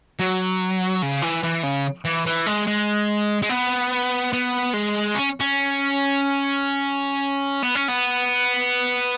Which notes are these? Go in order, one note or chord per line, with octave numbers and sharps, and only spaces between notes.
F#3
C#3
E3
E3
C#3
E3
E3
G#3
G#3
G#3
B3
B3
G#3
C#4
C#4
B3
C#4
B3